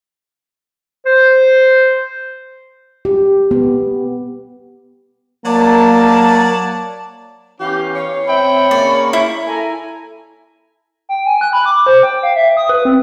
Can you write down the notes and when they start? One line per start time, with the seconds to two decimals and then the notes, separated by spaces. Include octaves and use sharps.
1.06 C5
3.05 G4
3.51 B3
5.45 F#3 A#3 D5 A5
7.60 E3 B3 C#4 G4 F5
7.96 C#5 F5
8.26 C4 E5 G5 B5
8.71 C#3 A#3 D5
9.13 E4
9.46 A4 E5 G#5 A#5
11.09 G5
11.26 G#5
11.41 F#6
11.53 B5
11.66 D6
11.86 C5
12.03 G5
12.23 F5
12.36 E5
12.57 D#6
12.69 B4
12.85 C4